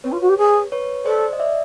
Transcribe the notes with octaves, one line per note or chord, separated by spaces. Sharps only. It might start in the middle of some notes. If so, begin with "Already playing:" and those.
C4 B4 C#5
F4
F#4
G4
G#4
B4 C#5
A4 C5 D5
D#5
D5 E5